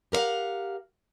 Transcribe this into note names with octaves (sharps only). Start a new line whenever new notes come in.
G4 A#4 B4 F5 F#5